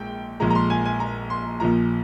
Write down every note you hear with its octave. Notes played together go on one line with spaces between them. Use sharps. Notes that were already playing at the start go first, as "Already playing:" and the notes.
Already playing: A#1 G#2 G5
A#1 A#2 F3 G#3 A#5
A#5
C6
G#5
G#5
A#5
C6
A#1 A#2 F3 A#5